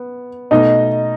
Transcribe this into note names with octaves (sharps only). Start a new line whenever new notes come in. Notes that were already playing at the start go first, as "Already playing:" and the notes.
Already playing: B3
B2 A3 D#4 D#5